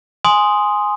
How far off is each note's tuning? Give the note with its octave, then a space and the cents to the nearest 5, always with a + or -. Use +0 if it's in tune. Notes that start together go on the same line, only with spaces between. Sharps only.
G#5 +0 C6 +0 D#6 +0